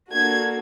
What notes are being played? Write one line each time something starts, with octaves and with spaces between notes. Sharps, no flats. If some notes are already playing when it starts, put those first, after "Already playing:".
A#3 D4 F#4 A4 G#6